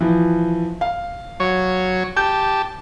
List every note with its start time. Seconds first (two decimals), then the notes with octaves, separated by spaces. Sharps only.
0.01 E3 F3
0.81 F5
1.40 F#3 C#5
2.16 G4 A5 G6